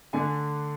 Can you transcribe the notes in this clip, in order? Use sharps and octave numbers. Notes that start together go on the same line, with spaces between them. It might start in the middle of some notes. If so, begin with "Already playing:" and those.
D3 A3 D4 G#5